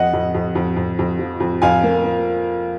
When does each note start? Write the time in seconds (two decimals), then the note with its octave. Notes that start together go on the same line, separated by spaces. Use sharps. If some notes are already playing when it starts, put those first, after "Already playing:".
Already playing: F2 D#5 F#5
0.13 F2
0.35 F2
0.55 F2
0.77 F2
0.99 F2
1.19 F3
1.40 F2
1.62 F2 F5 G#5
1.83 A#3
2.04 A#3